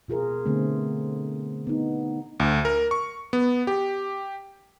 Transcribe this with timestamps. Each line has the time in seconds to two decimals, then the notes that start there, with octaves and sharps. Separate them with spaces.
0.08 B2 F4 G#4 A#4
0.45 D3 A3 B3 C4
1.67 B3 D#4
2.40 D2
2.65 A#4
2.91 C#6
3.33 B3
3.67 G4